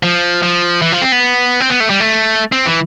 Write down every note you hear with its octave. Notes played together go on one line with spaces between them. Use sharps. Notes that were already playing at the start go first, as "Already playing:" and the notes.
F3
F3
E3
F3
C4
B3
C4
B3
A3
G3
A3
C4
E3